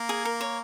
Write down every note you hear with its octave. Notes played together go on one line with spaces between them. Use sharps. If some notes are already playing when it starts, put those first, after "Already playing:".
Already playing: A#3
G#4
A#4
C#5